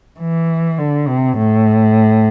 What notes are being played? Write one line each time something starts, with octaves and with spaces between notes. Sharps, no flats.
E3
D3
C3
A2